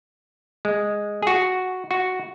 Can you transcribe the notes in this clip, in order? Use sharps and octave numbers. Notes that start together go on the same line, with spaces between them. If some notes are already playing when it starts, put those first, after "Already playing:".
G#3
G#4
F#4
F#4